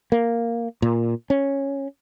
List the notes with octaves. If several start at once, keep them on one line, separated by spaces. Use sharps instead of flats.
A#3
A#2
C#4